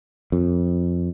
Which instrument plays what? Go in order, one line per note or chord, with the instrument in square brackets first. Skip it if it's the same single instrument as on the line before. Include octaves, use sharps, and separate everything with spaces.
[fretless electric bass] F2